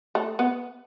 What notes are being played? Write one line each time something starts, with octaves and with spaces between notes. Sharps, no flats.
A3
B3